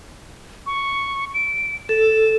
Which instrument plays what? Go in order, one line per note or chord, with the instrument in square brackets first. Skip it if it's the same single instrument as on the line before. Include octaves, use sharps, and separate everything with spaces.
[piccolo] C#6
D7
[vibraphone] A4 [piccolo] E7